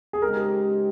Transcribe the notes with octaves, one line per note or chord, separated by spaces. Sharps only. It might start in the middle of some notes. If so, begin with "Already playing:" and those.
G#4
C#3 G#3 C4 D#4 G4 A#4